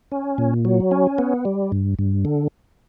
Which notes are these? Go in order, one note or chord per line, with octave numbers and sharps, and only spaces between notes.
C#4
A#2
F#3
C#4
B3
G3
G2
G2
D3